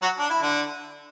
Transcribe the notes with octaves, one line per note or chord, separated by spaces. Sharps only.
F#3 F#4
D4
E4
D3 D4